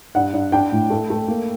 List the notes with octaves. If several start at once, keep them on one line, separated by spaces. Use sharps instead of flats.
G2 F#5
G2
D4 G5
A2
A3
A3
A#3